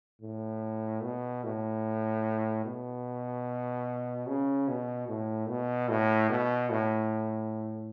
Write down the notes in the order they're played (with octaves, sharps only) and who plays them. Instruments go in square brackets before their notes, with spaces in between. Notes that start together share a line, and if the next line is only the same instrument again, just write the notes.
[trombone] A2
B2
A2
B2
C#3
B2
A2
B2
A2
B2
A2